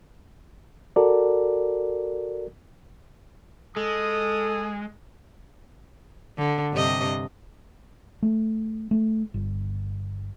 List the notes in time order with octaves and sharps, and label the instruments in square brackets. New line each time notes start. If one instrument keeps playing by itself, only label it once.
[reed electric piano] F#4 A4 A#4 D5
[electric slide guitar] G#3 [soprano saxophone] A4 [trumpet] D#6
[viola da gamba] D3
G2 C3 D#5
[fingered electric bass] A3
A3
G1